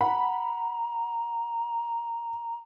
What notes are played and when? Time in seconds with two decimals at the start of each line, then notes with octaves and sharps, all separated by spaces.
0.01 F#5 A#5 B5